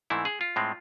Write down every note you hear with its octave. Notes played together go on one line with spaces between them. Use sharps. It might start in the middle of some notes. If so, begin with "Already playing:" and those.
G#2 E3 A3 C4 E4
G#4
F4
A2 G#3 C4